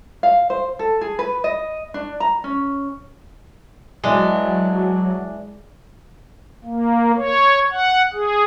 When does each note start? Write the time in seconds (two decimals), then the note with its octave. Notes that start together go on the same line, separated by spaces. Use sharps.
0.23 F5
0.50 C5
0.79 A4
1.01 G#4
1.19 B4
1.44 D#5
1.94 D4
2.20 A#5
2.44 C#4
4.04 E3 F#3 G#3 D4
6.64 A#3
7.16 C#5
7.70 F#5
8.13 G#4